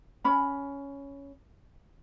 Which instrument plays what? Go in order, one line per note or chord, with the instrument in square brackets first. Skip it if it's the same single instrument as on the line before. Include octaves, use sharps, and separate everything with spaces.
[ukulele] C#4 B5